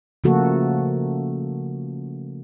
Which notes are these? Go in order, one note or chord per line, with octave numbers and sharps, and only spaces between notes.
C#3 F3 A3 A#3 F#4 A4